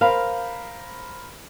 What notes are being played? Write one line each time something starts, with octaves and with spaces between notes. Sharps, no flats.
A#4 C5 F5 B5